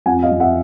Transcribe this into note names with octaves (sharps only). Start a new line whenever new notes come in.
F2 F#5 G#5
D#5 F5
F2
E5 F#5